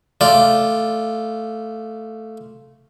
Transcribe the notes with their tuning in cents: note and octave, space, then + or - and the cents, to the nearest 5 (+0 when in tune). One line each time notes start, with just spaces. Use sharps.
A3 +0 F4 -5 D5 +0